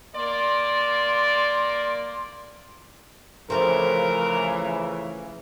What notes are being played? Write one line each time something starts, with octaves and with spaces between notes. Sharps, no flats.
A#3 D5 C6
C#3 E3 F3 A3 C4 A#4